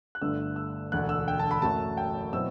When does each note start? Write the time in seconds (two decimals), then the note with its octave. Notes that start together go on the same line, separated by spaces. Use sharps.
0.15 F#6
0.22 G1 G2 D3 A3 E6
0.56 E6
0.92 E1 D2 D3 F#6
1.09 E6
1.28 G5
1.40 A5
1.51 B5
1.62 F#1 F#2 F#3 A3 A5
1.97 G5
2.33 B2 F#3 C4 E4 E6